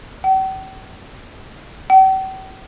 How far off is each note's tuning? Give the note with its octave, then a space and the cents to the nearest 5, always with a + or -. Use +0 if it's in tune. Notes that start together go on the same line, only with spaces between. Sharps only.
G5 -45
G5 -45